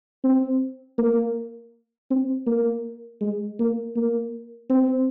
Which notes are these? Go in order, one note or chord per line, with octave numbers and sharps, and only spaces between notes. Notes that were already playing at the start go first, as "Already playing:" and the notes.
C4
A#3
C4
A#3
G#3
A#3
A#3
C4